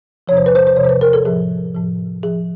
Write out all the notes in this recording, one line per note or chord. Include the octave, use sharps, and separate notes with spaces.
E2 C3 F3 C#5
C5
B4
C5
C5
E2 C3 F3 C#5
C5
B4
A#4
A4
A2 F3 G#4
A2 F3
A2 F3 G#4